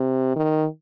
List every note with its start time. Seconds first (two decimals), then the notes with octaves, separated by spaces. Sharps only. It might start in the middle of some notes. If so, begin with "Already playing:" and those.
Already playing: C3
0.36 D#3